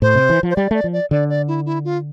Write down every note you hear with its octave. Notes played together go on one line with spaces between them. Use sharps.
A2 C5
C3
E3
F3
C5
G3 D5
A3 D5
F3
D5
D3 D5
D5
E4
E4
F4